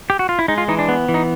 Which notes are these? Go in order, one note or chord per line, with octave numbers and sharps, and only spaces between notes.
G4
F#4
F4
E4
G#3 D#4
F4
E3 D#4
D4
B3
E3
D#4